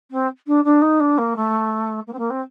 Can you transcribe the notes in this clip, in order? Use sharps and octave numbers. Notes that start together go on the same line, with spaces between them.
C4
D4
D4
D#4
D4
A#3
A3
A#3
C4
A#3
C4